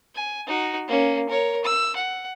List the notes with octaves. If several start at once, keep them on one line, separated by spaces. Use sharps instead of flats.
G#5
D#4 F#4
A#3 C#4
A#4 C#5
E6
F#5